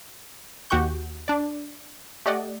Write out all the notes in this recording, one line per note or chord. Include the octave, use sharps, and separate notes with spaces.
D#2 F#4 G4 F#5 C#6 G6
D4 D5
A3 G4 D5 D#5 F#5